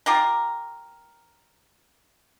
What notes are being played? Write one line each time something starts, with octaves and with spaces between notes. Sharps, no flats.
F4 G4 A#4